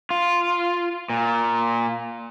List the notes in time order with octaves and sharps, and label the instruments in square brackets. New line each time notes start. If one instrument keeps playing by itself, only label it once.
[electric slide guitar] F4
A#2